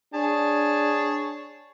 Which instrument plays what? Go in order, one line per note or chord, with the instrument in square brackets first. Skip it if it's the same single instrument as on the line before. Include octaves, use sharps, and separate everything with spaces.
[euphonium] D4 [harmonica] G#4 C#5 A5